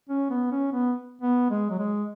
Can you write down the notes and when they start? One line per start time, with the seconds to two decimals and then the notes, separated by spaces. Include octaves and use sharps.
0.09 C#4
0.30 B3
0.52 C#4
0.72 B3
1.22 B3
1.50 G#3
1.70 F#3
1.78 G#3